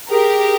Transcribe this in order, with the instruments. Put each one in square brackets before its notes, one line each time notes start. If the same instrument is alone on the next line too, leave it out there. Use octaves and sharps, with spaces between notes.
[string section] G4 A#4 [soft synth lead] G#4